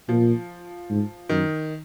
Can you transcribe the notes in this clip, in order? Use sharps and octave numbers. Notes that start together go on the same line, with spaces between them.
A#2 F3
G#2
F#2 D#3